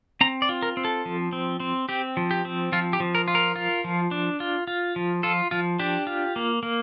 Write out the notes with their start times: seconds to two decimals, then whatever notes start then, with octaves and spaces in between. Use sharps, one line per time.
0.21 C4 A#5
0.42 D5
0.49 F4
0.62 A#4
0.77 C4
0.85 A4
1.05 F3
1.33 C4
1.60 C4
1.89 C4 G4
2.17 F3
2.31 G4
2.45 C4
2.72 F3 F4
2.93 G4
3.00 F3
3.15 A#4
3.28 F4
3.35 A#4
3.56 F4
3.84 F3
4.11 D4
4.40 F4
4.67 F4
4.96 F3
5.23 F4 A4
5.51 F3 F4
5.79 D4 G4
6.07 F4
6.36 A#3
6.63 A#3